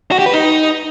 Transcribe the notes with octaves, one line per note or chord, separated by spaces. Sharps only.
F#4
G4
B4
D#4